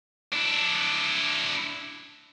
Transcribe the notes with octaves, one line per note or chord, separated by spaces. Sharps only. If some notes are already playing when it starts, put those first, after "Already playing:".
D4 E4